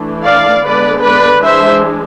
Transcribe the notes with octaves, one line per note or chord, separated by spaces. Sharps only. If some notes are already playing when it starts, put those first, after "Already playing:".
Already playing: E3 A3 D4
D5 F5
D3 G#3 B3 B4 D5
B4 D5
E3 G#3 D4 C5 E5